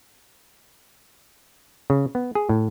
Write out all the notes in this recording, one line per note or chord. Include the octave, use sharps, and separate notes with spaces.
C#3
B3
G#4
A2